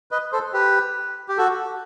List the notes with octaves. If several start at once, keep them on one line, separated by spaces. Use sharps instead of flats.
B4 D#5
A4 C5
G4 B4
G4
F#4 A4